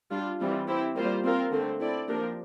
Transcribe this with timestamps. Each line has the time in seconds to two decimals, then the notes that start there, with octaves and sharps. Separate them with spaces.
0.11 G3 D4 F4
0.40 E3 G3 C4 F4
0.68 C4 E4 G4
0.96 G3 A#3 F4 C5
1.24 C4 F4 A#4
1.52 D3 A3 C4
1.80 C4 E4 A4 D5
2.08 F3 A#3 D4 G4 A#4